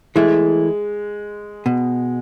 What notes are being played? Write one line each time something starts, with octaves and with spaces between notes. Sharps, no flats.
E3 G#3 A3 E4
B2